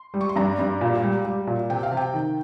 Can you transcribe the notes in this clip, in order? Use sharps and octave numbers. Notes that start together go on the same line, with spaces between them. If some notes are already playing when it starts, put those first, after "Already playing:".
Already playing: C6
G3
C#6
C6
G2 A#5
G2
A#2
G3
G3
A#2
C3 G5
F5
C3
G5
D#3